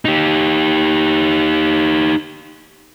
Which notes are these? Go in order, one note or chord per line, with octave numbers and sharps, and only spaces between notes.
D#4 G4